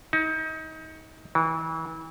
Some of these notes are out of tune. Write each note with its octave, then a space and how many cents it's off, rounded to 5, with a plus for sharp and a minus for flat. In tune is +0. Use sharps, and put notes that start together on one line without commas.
D#4 +30
E3 -30